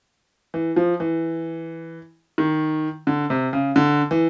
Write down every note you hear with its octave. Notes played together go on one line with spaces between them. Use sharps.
E3
F3
E3
D#3
D3
C3
C#3
D3
E3